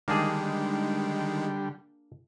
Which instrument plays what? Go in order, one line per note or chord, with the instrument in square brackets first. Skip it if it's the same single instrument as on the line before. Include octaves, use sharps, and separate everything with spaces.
[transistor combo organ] D3 G3 [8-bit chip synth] D#3 G#3 [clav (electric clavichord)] A#3 D4 G#4